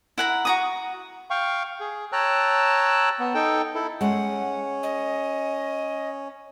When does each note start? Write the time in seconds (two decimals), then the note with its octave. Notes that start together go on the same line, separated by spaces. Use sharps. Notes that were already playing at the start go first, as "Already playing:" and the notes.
0.18 E4 F#5 A#5
0.45 F#4 A#5 D#6
1.30 F5 G5 C#6
1.80 G#4
2.12 C#5 G5 A5 A#5 E6 F#6
3.19 B3
3.35 D#4 A4 G5
3.75 E4 A4
4.01 G#3 C#4 F#5
4.83 D#5